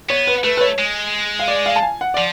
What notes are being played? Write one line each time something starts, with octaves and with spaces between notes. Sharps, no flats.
B3 C#5
B4
A3 B4
B4
C#5
G#3
F5
D5
F5
A5
G#5
F#5
D5
F3